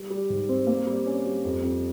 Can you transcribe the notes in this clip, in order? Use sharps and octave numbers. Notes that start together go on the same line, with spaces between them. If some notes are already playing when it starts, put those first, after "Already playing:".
Already playing: G3
G3
G#2
C4
A#3
G3
C#4
G3
F2
F2